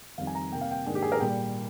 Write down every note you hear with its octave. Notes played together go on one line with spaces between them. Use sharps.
F2 D#3 G3 F5
G#5
A#5
C3 G3 A#3 G5
F5
G5
G#2 D#3 A#3 D4 G#4
G4
G#4
A#4
A#2 G3 G5